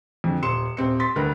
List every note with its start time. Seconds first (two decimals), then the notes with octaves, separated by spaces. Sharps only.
0.24 F2 D3
0.42 D#1 C6 C#7 E7
0.77 D#1 C4 C#7
1.00 C6 A6 B6
1.16 D2 G3 A#4 B4